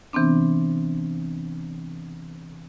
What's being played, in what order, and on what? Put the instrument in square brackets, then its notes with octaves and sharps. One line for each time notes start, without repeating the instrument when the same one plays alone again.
[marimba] C3 E3 B3 C4 D4